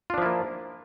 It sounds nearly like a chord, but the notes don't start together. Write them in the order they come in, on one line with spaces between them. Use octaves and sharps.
F4 D4 F3 E4 A#3